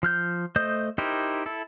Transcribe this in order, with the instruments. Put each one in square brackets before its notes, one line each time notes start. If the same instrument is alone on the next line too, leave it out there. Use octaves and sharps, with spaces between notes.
[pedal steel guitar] F3 F6 G6
A3 C5 D#5 D#6 G6
D#4 E4 G4 A#4 C5
E4 A4